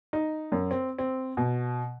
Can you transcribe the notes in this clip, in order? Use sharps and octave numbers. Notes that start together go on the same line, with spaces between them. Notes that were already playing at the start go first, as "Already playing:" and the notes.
D#4
F#2
C4
C4
B2